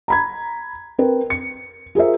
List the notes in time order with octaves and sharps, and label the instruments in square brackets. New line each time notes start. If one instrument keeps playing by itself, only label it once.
[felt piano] A#5 B5 G#6
C4 A#4 B4
C#7
F4 G#4 A#4 C5 E5